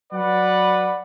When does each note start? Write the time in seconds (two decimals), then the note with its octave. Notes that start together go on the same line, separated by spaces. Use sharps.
0.12 F#3 B4 D5 F#5